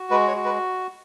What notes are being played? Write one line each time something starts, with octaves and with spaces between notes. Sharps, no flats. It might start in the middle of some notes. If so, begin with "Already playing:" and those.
Already playing: F#4
G#3 B4
C#5
F#4
B4